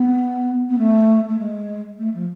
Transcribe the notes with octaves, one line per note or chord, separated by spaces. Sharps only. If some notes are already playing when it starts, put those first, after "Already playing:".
Already playing: B3
B3
A3
A3
G#3
A3
F3